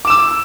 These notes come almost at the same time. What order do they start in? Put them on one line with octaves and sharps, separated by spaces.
D6 E7 E6